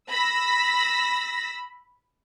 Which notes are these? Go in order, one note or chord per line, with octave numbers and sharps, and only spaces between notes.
B5 E6 A#6 B6